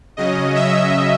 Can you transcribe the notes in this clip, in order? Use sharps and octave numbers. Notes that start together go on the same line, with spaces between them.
C#3 F#3 C#4 D#5
E5